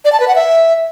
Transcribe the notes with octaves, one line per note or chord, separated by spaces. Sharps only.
D5
A5
B4
F#5
E5